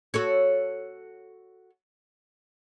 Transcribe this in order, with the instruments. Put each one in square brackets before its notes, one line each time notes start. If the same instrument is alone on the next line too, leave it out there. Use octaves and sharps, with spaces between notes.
[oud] F#4 A4 C#5